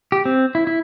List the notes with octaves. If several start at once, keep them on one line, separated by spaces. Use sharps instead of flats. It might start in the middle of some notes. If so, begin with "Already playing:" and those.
G4
C4
E4
E4